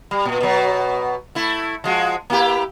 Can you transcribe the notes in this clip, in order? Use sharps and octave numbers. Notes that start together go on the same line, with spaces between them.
G3
A#2
B2 F#3
A3 E4
F3 G#3 F#4
A#3 E4 G4